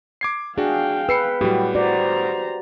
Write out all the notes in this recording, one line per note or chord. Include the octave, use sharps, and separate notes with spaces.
D6 G#6 C7
D4 F#4 G#4 F5 G5
B4 E6 C7 C#7
A2 F#3 G3 F#4 G4
F#4 C5 D5 A#5